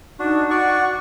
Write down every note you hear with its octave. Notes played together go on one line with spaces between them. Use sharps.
D4 D#4 F#4
F#4 D5 F#5 C#6